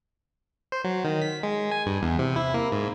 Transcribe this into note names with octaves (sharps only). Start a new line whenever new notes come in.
C5
F#3
D#3
B6
G#3
G#5
G2
E2
C3
E4
A#3
G#2